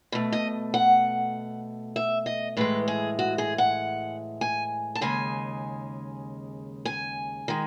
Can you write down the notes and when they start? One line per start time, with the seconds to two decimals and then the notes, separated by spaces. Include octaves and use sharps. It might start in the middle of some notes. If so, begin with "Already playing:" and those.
0.12 B2 A3
0.32 D#5
0.74 F#5
1.96 E5
2.26 D#5
2.57 A2 E3 G#3 B4
2.88 G#4
3.19 F#4
3.38 G#4
3.58 F#5
4.41 G#5
4.95 A5
5.01 D#2 C#3 G#3 G#5
6.85 G#5
7.48 D#3 G#3